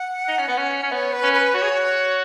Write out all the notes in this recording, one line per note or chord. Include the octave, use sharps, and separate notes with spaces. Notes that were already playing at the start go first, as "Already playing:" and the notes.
Already playing: F#5
D#4
C#4
B3
C#4
C#4
B3 C#5
B4
C#4
B4
F#4 C#5
G#4
F#4